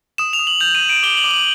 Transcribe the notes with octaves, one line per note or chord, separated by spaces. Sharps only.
D#6 E7
F7
D#6
F#7
G6 F7
D#7
G6
D7
D6 G7
F#7
D6
F#7